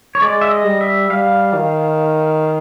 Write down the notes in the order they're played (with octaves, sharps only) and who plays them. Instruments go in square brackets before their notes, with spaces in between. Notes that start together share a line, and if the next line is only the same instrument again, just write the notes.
[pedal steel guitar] C#5
[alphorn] G#3 [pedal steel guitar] D5
[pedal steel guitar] E5
D#5
[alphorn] G3
[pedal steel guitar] E5
[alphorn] G3 [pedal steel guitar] F5
[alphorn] D#3